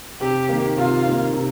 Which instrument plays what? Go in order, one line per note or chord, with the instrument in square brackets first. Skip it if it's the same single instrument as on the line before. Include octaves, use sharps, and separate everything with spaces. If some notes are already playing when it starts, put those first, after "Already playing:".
[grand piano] C3 [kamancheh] G4
[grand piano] D#3 A#3
[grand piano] C3 [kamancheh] F4
[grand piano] D#3 A#3
C3